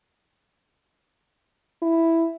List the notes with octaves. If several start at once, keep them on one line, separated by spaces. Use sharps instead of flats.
E4